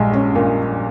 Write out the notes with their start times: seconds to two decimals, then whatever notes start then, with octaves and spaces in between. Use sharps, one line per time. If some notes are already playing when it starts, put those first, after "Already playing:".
Already playing: A#1 G2 G#3
0.13 C#4
0.35 A#2